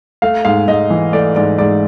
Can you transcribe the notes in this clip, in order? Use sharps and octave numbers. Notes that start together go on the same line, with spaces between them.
A3 F5
G#2 F5
G#2 D#5
E3
A3 D5
G#2 D5
G#2 D5